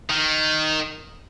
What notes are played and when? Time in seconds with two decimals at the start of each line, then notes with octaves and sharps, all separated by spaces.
0.10 D#3